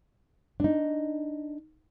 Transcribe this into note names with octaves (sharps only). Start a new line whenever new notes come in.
D4 D#4